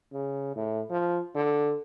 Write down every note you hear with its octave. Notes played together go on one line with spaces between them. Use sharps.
C#3
A2
F3
D3